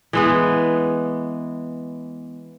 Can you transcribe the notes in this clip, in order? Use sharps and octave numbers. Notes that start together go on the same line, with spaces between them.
E3 G#3 B3